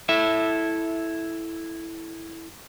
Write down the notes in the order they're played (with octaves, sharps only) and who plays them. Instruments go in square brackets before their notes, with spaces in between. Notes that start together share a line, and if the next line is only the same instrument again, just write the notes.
[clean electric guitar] E4 A4 E5